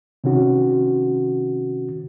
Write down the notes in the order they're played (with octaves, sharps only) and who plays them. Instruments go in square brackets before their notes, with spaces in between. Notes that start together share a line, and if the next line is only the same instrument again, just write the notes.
[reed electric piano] C3 D#3 C#4 F#4